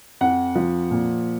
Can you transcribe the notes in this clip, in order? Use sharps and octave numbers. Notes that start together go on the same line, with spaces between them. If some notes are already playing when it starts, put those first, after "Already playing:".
F2 F#5
F3
A#2